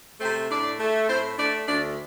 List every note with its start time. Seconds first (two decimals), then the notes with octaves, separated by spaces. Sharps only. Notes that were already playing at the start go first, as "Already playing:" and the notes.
0.20 C3 A3 C4 C5
0.50 A2 D4 D5
0.79 A3
1.08 A2 C4 C5
1.38 A3 D4 D5
1.67 D2 D4 D5